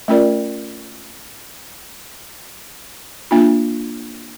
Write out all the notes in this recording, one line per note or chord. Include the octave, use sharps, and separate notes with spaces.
A3 C#4 F4 A#4 D5
A#3 D4 F4